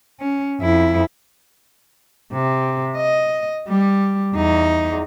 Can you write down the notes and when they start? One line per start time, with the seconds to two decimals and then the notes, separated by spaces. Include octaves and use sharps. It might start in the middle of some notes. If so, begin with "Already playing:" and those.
0.20 C#4
0.60 F2 E4
2.33 C3
2.96 D#5
3.68 G3
4.34 E2 D#4